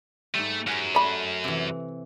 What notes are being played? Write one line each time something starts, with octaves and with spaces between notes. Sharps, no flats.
G#2 G3 A3
F#2 F#5 G#5 B5
A3 D5 B5
C3 E3